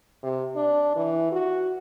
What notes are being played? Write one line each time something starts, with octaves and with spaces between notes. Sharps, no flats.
C3
D4
E3
F#4